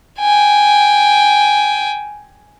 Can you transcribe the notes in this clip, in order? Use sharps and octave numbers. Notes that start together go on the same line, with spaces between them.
G5 G#5